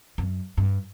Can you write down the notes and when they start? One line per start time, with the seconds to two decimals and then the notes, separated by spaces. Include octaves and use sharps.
0.18 F#2
0.57 G2